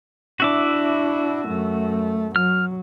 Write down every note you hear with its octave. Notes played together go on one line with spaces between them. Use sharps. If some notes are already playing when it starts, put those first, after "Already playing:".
D4 E4 F#4 E5 D6
F#2 A3
F#3 F6